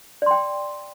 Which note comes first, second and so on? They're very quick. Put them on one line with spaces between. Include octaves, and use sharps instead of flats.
D5 C6 G5